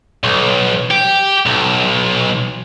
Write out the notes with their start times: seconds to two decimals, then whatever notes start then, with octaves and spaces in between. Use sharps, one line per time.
0.24 B1
0.91 G4
1.46 B1